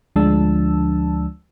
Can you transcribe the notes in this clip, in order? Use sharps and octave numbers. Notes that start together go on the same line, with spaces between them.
D2 F3 G#3 D4 A5 E6